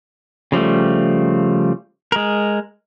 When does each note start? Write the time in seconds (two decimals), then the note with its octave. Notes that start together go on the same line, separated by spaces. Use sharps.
0.52 C#3 F3 G3 A3
2.12 G#3 A#4